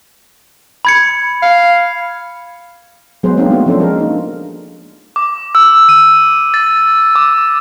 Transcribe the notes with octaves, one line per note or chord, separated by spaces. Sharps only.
B5 G#6 C#7
F5
F#3 G#3 B3 G#4 B4 C5
G#3 A#3 C4 D4 D#4
G#3 A3 B3 F#4
F3 C#4 D4 A4 C5
G#3 A#4
A#3 D#4
D6
E6
D#7
A6
D6